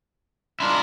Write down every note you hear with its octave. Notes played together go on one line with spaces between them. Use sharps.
G#3 D4 E4 F4 A#4